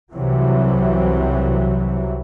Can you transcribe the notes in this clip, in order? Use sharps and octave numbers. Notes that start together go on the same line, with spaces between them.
C2 C3 E3 F#3